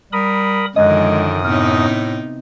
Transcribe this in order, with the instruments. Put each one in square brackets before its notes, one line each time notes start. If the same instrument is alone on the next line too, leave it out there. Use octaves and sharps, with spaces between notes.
[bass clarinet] G3 [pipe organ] A#4 B5 D#6
[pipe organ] F#2 D#6 [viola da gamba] D3 D#3 F3 [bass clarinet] G#3 [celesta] D#5 F#6
[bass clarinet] A2 [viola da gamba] C3 B3 D#4 [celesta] F6